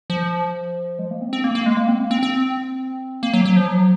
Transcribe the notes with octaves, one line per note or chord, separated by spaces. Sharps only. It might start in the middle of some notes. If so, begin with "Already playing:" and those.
F3
G#3
A#3
C4
C4
A#3
A#3
G#3
A#3
C4
A#3
C4
C4
A#3
F#3
F#3
F3
F#3